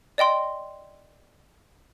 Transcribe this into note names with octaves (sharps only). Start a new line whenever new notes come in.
D5 D#5 G5 C6